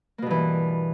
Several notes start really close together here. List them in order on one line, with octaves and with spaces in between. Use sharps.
A#3 B2 G2 E3